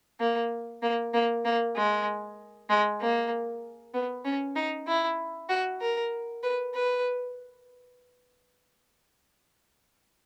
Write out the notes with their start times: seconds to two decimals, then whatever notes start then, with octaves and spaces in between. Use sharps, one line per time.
0.20 A#3
0.82 A#3
1.14 A#3
1.45 A#3
1.76 G#3
2.70 G#3
3.00 A#3
3.94 B3
4.24 C#4
4.55 D#4
4.87 E4
5.49 F#4
5.81 A#4
6.43 B4
6.74 B4